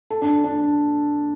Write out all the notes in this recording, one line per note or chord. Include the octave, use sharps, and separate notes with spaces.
A4
D4
D4